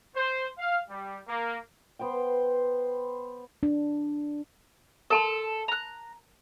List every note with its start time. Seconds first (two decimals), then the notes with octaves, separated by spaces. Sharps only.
0.15 C5
0.59 F5
0.89 G3
1.28 A#3
1.99 B3 C5 F#5 G5
3.63 D4
5.10 A4 A#4 A5 C6
5.68 A#5 F#6